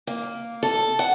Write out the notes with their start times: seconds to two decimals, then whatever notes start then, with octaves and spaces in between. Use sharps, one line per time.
0.07 A#3
0.63 A4
0.99 F#5